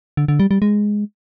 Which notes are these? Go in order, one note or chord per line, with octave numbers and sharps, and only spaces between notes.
D3
D3
G3
G3
G#3